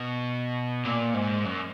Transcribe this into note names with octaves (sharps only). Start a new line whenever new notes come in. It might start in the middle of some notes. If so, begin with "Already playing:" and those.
Already playing: B2
A#2
G#2
F#2